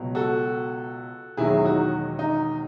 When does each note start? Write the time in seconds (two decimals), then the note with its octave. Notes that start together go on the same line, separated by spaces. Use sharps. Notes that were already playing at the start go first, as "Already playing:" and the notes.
Already playing: C#2 B2 F#3
0.15 F#4 A4
1.37 E1 E2 D#3 F#3 E4 G#4
1.64 D#4 F#4
2.19 D#4